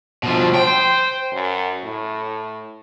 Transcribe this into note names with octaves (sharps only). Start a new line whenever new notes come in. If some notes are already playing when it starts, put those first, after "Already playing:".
B2 F3
C5 G5
F#2
A2